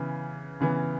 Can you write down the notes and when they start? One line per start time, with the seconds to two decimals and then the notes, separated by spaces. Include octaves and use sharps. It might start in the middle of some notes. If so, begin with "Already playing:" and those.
Already playing: C#3 E3 B3
0.61 C#3 E3 B3